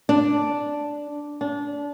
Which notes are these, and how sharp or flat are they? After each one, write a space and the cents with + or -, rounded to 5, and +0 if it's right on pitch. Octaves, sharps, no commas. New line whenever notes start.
D4 -5
D4 -25